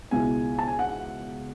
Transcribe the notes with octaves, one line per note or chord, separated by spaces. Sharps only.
C#2 B2 G#3 B3 E4 G#5
A5
G#5
F#5